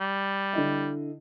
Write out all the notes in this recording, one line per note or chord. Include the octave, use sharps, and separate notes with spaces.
G3
D3 E4 D#5